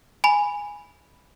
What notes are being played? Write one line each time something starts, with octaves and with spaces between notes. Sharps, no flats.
G#5 B5